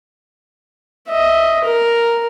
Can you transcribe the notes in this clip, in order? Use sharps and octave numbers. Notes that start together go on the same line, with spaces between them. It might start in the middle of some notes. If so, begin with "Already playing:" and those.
D#5 E5
A#4